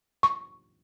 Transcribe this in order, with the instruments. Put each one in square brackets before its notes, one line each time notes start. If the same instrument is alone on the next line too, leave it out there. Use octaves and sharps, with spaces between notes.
[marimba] C#6